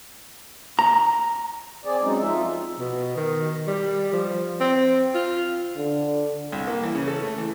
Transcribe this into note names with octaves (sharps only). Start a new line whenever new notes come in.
A#5
C4 G#4 D5
F#3 G#3 C4 C#4 D#4
F2 F3 D#4 F4 E5
B2
D#3
G3
F3
C4
F4
D3
C2
A#3
E3
C#3
A4
A3
E3